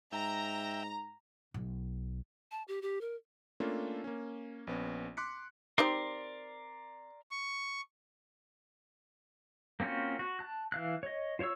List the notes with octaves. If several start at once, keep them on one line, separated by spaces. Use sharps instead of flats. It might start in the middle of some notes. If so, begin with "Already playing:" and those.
G#2 E5 G5 A#5
B1
A5
G4
G4
A#4
A3 A#3 C#4 D4 F4 A4
A#3 C#4
A#1 B3 C#4
C6 D6 F#6 B6 C#7
C4 D#4 G4 A#4 D5 C6
C#6
A#3 C4 C#4 F4 F#4
F#4
A5 F#6
E3 F5 F#6
C#5 D#5
F4 C5 C#5 C#6 E6